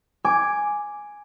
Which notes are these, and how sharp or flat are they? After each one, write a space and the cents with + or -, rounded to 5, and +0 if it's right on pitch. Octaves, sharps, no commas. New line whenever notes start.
G#5 +0 D6 +0